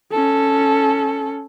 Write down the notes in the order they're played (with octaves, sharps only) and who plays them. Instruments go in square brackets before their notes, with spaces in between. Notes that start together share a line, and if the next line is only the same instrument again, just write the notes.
[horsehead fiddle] C#4 A4